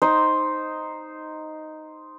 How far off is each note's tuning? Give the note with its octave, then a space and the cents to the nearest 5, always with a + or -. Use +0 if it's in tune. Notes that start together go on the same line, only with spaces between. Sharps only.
D#4 +0 C5 +0